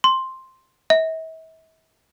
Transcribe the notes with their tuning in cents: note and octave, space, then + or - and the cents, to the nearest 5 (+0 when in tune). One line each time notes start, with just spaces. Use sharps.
C6 +5
E5 -40